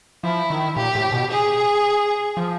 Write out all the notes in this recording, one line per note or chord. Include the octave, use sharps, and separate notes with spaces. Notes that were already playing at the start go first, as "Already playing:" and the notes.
F3 E4
D#3
A#2 G4
A2
B2
G#4
F3